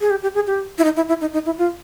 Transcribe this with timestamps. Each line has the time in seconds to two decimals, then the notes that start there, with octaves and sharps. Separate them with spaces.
0.01 G#4
0.10 G4
0.23 G4
0.35 G#4
0.47 G4
0.78 E4
0.84 D#4
0.97 E4
1.09 E4
1.21 D#4
1.33 D#4
1.46 E4
1.58 F4